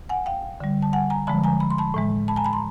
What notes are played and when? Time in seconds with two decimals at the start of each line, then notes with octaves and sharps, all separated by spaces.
0.09 F#5 G#5
0.26 F5 G5
0.60 D3 G3
0.82 A5
0.93 F#5 G#5
1.10 G#5 A#5
1.27 D3 F3 G#3 A5 B5
1.44 G#5 A#5
1.60 B5
1.70 C6
1.78 A5 B5
1.94 A2 E3 G#3
2.28 A5 B5
2.36 G#5 A#5
2.45 A5 B5
2.53 A#5 C6